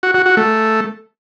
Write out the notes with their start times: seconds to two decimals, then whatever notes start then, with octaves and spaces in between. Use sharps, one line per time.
0.03 F#4
0.14 F#4
0.26 F#4
0.37 A3